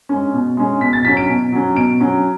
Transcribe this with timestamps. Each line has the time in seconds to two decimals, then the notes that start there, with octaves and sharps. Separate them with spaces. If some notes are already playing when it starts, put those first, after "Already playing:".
0.09 G#3 C#4
0.33 B2
0.57 G#3 C#4
0.81 B2 B6
0.93 A6
1.05 F#3 C#4 B6
1.17 D7
1.29 B2
1.52 F#3 C#4
1.76 B2 D7
2.00 F#3 C#4